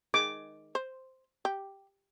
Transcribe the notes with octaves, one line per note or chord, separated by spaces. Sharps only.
D#3 G#3 D6
C5
G4